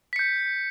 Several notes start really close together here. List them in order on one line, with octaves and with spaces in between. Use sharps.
B6 C#7 G6